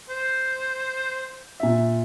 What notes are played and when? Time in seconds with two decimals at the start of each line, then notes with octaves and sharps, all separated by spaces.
0.09 C5
1.60 A#2 E5